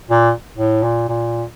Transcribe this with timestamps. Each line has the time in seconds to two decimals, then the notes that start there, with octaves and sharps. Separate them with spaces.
0.10 A#2
0.56 A2
0.83 A#2
1.09 A#2